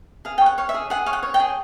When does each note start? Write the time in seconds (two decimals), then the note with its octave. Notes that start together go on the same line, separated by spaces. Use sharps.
0.25 G#4 F5
0.38 G5
0.41 C#5
0.46 F#5
0.58 C#5 F5
0.69 E5
0.74 G#4
0.90 G#4 F#5
1.06 C#5 F5
1.13 F#5
1.23 C#5
1.34 G5
1.40 G#4